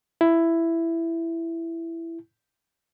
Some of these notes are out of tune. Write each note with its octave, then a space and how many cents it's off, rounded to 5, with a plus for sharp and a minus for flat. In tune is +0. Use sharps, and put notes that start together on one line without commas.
E4 +10